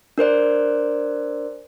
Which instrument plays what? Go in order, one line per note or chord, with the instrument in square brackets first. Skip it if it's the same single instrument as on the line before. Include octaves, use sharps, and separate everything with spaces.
[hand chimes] D4 A#4 C5 D5